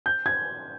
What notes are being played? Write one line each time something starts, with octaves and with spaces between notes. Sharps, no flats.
G6
G#6